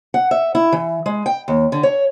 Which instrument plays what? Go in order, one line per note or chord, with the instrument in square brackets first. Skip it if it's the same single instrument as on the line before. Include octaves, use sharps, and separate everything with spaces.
[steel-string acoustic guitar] F#5
E5
E4
E3
G#3
G5
D#2
D3
C#5